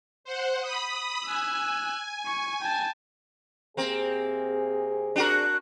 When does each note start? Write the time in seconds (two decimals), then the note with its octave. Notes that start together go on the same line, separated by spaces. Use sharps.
0.24 C5 F#5
0.61 B5 D#6
1.25 G#5 E6 F#6
2.26 C#6
2.61 G5 A5
3.77 C3 A#3 C4 G#4
5.16 D4 F#4 A#4